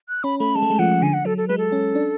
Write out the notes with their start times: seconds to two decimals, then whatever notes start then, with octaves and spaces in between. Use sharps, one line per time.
0.09 F#6
0.24 C#4 B5
0.39 A3 B5
0.55 G#3 A5
0.62 A3
0.70 G#3
0.79 F3 F#5
1.02 D3 G#5
1.14 F#5
1.25 F#3 A4
1.37 A4
1.48 G#3 B4
1.58 A4
1.72 C#4
1.95 D4